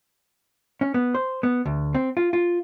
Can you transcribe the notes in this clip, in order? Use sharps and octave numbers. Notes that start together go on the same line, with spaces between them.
C#4
B3
C5
B3
D2
C4
F4
F4